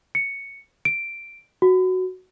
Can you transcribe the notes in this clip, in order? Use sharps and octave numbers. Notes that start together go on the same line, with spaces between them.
C#7
D7
F#4